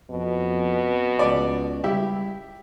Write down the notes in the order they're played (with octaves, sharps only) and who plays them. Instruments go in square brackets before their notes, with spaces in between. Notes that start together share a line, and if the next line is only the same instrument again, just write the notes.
[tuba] F2 [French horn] B2
[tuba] C#2 [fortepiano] D5
[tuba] G3 [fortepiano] E4 G4 E5